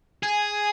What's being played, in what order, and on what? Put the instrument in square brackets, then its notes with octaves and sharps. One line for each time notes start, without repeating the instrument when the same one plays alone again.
[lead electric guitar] G#4 [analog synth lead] G#5